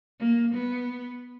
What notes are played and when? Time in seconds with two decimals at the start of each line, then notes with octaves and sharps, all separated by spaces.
0.20 A#3
0.54 B3